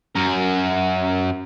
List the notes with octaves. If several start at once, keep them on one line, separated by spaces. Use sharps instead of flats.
F#2 A#4